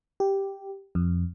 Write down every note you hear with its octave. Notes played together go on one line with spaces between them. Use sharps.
G4
F2